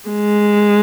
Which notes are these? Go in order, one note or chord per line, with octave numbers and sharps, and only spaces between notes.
G#3